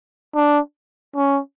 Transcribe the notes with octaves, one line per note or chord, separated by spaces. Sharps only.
D4
C#4